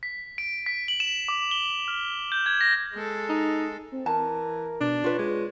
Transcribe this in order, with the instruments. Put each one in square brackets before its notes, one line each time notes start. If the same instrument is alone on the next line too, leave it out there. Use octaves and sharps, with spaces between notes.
[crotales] B6
D7
B6
F#7
E7
D6
G7
F6
G6
G#6
A#6
[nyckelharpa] G#3 A4
[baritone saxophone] D#4
[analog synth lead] C4
[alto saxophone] E3 [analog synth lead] A#4 [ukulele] A5
[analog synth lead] B2 [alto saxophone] D4
[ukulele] F4 B4 [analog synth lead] C#5
[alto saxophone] G#3